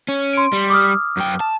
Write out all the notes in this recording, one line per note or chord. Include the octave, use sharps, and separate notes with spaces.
C#4
C6 D7
G3
D6 D#6 F6
F#2 G5
A5